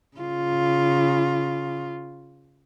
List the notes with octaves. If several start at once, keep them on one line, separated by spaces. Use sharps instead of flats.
C#3 F4